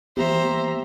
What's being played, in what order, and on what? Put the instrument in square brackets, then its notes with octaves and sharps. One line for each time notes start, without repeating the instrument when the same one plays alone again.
[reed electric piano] E3 A#3 B3 [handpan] G4 [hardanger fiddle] C5 [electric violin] E5 A#5